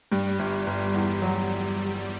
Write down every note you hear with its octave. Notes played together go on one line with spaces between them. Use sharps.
G2 G3
G1
G1
E2
F#3